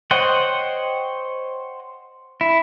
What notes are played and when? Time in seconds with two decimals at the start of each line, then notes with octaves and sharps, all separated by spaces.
0.11 C5 C#5 D#5 F#5 G5
2.41 E4